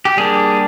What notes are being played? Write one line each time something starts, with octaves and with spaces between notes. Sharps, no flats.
G4
G3 A#3 D4 G#4